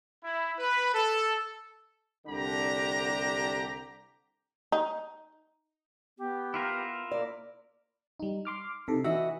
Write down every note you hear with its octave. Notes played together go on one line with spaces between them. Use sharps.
E4
B4
A4
C2 D3 D4 G4 A#5
D#4
B3 G4
E4 F4 A#4
A#3 D5
G3 D#4
C6 D6 F6
C3 D#4 A4
E3 F#4 D#5 E5